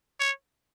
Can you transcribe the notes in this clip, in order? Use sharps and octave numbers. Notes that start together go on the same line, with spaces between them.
C#5